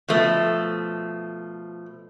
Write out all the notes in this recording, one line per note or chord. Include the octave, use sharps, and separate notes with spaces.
B2 F3 A3